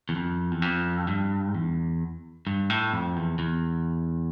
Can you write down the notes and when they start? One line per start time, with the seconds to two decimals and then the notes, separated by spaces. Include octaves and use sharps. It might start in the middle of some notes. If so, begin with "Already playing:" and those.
0.09 E2
0.16 F2
0.51 E2
0.62 F2
1.08 G2
1.54 E2
2.47 G2
2.70 A2
2.93 F2
3.16 E2
3.39 E2